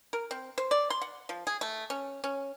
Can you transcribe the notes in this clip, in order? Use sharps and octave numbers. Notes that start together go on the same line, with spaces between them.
A#4
C4
C5
D5
C6
F#5
F3
G#4
A3
C#4
C#4